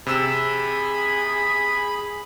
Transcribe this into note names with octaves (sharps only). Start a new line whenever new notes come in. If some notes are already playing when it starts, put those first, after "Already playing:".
C3 G#4 B5 E6 E7